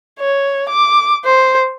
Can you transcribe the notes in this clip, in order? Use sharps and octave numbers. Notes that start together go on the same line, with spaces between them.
C#5
D6
C5